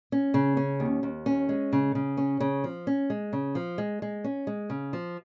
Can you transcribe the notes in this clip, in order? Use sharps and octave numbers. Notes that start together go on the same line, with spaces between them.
C#4
C#3
C#4
D#2
D#2
C#4
G#3
C#3
C#3
C#4
C#3
F3
C#4
G#3
C#3
F3
G#3
G#3
C#4
G#3
C#3
F3